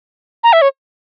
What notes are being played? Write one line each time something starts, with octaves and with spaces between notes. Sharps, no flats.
A#5
E5
C#5